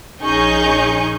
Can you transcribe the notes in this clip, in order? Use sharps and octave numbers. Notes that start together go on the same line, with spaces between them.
A#1 C#4 D#4 G#4 C#6 G6